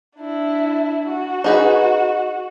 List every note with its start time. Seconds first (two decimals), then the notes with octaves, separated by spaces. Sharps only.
0.18 D4 E4
1.09 F#4
1.44 D#4 G#4 B4